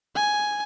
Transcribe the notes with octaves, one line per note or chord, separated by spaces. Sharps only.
G#5